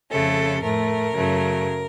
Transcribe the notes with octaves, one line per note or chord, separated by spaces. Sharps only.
F2 C#3 A3 A4
A2 A3 A#4
F#2 C#3 F#3 A3